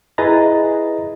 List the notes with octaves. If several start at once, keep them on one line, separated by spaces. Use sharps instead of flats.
E4 G#4 B4 D#5 A#5 A6